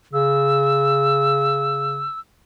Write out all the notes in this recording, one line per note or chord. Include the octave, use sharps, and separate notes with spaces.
C#3 E6